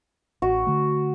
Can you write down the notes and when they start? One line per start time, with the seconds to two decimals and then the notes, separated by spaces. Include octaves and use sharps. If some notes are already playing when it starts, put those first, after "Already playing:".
0.42 A1 F#4
0.67 D3 A3